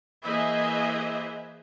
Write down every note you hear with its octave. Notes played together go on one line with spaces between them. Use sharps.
E3 A#3 G#4 C5 D#5 E5